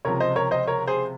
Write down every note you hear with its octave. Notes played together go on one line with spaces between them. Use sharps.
C#2 C3 F3 A#4 C#5
C5 D#5
A#4 C#5
C5 D#5
A#4 C#5
G#4 C5